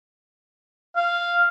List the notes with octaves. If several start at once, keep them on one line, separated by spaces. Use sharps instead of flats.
F5